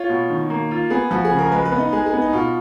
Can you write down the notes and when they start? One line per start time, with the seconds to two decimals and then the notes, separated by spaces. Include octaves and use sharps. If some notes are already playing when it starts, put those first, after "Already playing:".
Already playing: F4 C#5
0.09 B2
0.30 D#3
0.50 A#3
0.71 F4
0.90 B3 G#4
1.11 F3 F#4
1.25 G#4
1.31 C#3
1.39 A#4
1.52 G#3 B4
1.65 B4
1.72 B3
1.79 D#4
1.92 G#3 G#4
2.06 G#4
2.13 B3
2.22 D#4
2.33 B2 F4